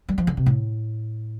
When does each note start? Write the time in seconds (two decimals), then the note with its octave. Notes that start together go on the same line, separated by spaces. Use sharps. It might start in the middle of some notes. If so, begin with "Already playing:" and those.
0.09 G3
0.18 F3
0.27 D3
0.37 C3
0.46 A2